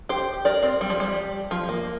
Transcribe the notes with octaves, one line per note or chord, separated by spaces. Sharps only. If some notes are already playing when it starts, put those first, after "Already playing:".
G4 C5
A#4 D5
C4
G3
F3
G3
F3
A#3